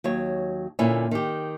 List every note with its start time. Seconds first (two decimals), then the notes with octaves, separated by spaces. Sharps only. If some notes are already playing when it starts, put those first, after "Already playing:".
0.04 D#2 F#3 C#5
0.79 A#2 D3 C#4 E4
1.11 D#3 G4